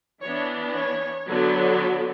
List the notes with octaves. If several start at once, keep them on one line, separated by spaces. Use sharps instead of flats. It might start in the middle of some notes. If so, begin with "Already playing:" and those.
E3 B3 D4 C#5
C#5
D3 F#3 B3